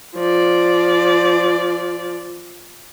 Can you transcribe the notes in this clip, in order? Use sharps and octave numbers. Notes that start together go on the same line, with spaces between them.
F3 D5